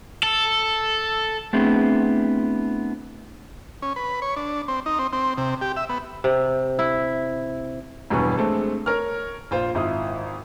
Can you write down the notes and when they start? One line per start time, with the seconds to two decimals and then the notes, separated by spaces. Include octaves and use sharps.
0.23 A4
1.53 A3 B3 C4 D4 E4 G#4
3.82 C#4
3.96 B4
4.22 C#5
4.36 D4
4.68 C4
4.86 D#4
4.99 C4
5.13 C4
5.38 C3
5.61 G4
5.77 E5
5.89 B3
6.24 C3
6.79 E4
8.10 E1 G2 E3 F#3 B4 C#6
8.37 G#3 A3 C4 D4 A4
8.86 A#4 C#5 F6
9.51 A#1 F4 C5
9.75 G#1 E4 F4 D#6